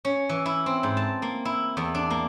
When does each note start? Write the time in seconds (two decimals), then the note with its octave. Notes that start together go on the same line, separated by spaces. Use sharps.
0.05 C#4
0.29 E3
0.46 E4
0.66 C4
0.83 G#2
0.97 A5
1.22 A#3
1.45 E4
1.77 E2
1.95 D4
2.10 A#3